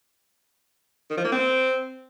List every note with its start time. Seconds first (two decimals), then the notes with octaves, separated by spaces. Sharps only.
1.10 D#3
1.17 F3
1.25 A#3
1.32 C4